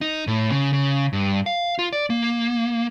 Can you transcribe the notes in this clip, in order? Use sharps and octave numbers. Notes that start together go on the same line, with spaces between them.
D#4
A2
C#3
C#3
G2
F5
F4
D5
A#3